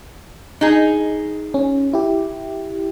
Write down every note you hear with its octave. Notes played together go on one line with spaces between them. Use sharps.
D#4 G#4
C#4
E4 G4